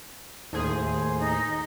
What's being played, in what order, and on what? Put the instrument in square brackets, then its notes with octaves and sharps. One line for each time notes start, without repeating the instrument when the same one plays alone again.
[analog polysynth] D#2 A2 G#4 [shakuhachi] C5
[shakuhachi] D#4